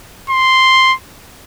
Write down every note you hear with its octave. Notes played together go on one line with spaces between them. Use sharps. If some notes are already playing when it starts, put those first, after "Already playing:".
C6